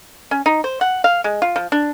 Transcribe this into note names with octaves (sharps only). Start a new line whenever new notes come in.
C#4
D#4
C5
F#5
F5
G#3
F4
F3
D4